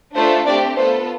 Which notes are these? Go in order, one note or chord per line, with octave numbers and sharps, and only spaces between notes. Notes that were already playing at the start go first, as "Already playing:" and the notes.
A3 D4 F4 A4 C5
A3 C4 D4 G4 D5
B3 F4 A4 C5